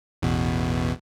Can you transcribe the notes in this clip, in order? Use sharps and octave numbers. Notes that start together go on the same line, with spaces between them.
A1 E2 B2